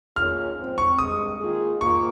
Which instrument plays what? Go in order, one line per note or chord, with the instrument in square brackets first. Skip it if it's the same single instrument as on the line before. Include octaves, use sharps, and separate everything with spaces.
[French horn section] D#3 A#3 C#4 F4 G#4 [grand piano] F6
[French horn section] G#2 F3 C4
[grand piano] C#6
[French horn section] G2 D#3 G#3 [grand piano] D#6
[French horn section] D#3 A#3 F4 G#4
[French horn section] G#2 D#3 A#3 F4 [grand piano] C#6